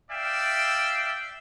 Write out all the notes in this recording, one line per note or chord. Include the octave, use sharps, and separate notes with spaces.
D5 E5 F5 G5